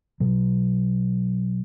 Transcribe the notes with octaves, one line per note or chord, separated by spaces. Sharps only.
B2 F#3